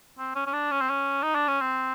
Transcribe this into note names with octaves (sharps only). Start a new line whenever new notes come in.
C4
C#4
C#4
D4
C#4
C4
C#4
D#4
D4
C#4
C4